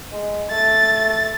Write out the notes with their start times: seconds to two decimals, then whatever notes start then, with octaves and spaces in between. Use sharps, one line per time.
0.12 G#3
0.51 A3 A6